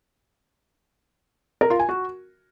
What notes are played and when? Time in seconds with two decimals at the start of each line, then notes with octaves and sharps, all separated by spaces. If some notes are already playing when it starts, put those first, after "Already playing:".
1.61 A#4
1.70 F4
1.79 G#5
1.89 F#4